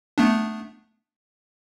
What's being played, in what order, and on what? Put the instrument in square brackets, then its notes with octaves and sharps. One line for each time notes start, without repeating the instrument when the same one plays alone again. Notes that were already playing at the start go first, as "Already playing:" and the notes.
[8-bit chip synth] A3 B3 D4